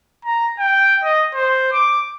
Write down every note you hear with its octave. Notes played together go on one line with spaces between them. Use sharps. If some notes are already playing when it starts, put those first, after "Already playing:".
A#5
G5
D#5
C5
D6